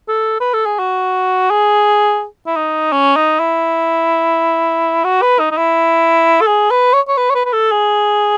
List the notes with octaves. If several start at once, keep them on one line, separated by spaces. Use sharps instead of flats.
A4
B4
A4
G#4
F#4
G#4
E4
D#4
C#4
D#4
E4
F#4
B4
D#4
D#4
E4
A4
G#4
B4
C#5
C#5
B4
C#5
B4
B4
A4
G#4